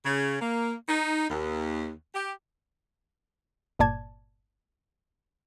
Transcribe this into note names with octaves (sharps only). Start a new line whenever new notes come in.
C#3
A#3
D#4
D#2
G4
G1 A#2 D5 A5 G#6